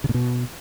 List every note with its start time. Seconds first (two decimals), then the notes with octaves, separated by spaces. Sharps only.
0.04 C#3
0.09 A#2
0.14 B2